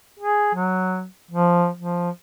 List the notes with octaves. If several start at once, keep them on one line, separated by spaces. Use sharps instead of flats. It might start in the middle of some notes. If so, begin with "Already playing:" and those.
G#4
F#3
F3
F3